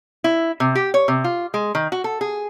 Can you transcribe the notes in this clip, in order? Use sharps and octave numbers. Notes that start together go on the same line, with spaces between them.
E4
C3
G4
C#5
C3
F4
G#3
D#3
F#4
A4
G#4